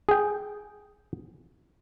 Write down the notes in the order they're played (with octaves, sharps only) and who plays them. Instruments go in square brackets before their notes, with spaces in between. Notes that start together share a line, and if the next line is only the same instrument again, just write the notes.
[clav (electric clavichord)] G#4 G5